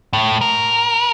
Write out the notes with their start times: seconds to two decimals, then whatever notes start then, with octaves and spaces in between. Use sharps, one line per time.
0.13 A2
0.41 A#4